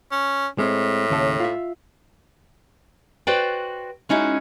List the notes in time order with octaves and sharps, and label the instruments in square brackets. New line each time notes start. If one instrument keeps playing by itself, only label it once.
[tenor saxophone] C#4
[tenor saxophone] A2 [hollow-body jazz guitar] G#3 C4
[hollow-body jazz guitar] D#2 C#3 A4
F4 E5
[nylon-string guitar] F#4 B4 C5 D5 G5
G#3 C#4 D#4 E4 F#4